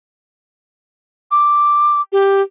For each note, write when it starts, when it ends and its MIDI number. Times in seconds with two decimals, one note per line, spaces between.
1.31 2.01 86
2.12 2.42 67